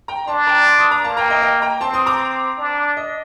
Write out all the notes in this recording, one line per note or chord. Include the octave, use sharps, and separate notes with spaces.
G5 A#5
D4 A5 C6
G5 A#5
A5 C6
C6 D#6
A#5 D6
A#3 A5 C6
G5 A#5
D#5 G5
D#5 G5
G5 A#5
C4 A5 C6
C6 D#6
A#5 D6
D4
D#5